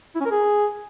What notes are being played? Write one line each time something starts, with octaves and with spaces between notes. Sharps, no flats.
E4
C#4
A#4
G#4